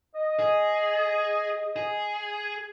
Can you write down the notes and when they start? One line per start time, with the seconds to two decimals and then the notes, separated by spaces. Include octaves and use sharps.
0.15 D#5
0.39 G#4
1.76 G#4